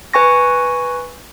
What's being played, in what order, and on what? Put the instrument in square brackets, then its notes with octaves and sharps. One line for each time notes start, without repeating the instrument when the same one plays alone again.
[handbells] B4 G#5 C#6 A#6